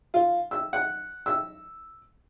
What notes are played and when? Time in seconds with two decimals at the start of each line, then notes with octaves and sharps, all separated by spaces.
0.14 F4
0.51 E6
0.73 F#5
1.26 E6